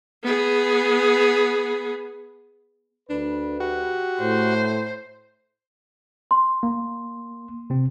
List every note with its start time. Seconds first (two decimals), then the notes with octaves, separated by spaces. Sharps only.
0.24 B3 G#4
3.10 D2 D4 B4
3.60 F#4 G4
4.20 A2 C5
6.31 C6
6.63 A#3
7.70 C3 C4